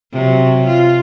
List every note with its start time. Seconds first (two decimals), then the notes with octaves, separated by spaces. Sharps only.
0.12 C3 F#3
0.66 F4